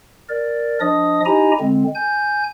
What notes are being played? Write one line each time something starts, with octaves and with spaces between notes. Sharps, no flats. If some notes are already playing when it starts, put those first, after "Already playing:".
A#4 D5
F3 D4 D#5 D#6
D#4 E4 G4 D#5 G#5 A#5
D3 G#3 C4
G#5 G6